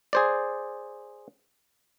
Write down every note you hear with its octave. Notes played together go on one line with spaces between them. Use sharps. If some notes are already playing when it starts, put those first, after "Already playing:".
G#4 C5 D5